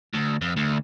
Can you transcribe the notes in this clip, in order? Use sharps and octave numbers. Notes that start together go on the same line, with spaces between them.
D2
F2
D2